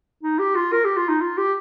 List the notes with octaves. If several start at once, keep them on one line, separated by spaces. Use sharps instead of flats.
D#4
G4
F4
A#4
G4
F4
D#4
F4
G4